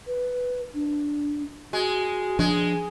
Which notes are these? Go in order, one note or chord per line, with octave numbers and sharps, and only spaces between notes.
B4
D4
G#3 F#4
F3 G#3 D4